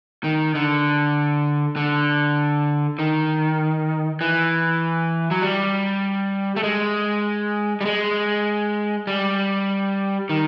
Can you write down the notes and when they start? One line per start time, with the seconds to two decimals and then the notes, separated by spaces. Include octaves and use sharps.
0.24 D#3
0.55 D3
1.76 D3
2.99 D#3
4.21 E3
5.31 F#3
5.42 G3
6.56 A3
6.63 G#3
7.81 G3
7.85 G#3
9.07 G3
10.29 D#3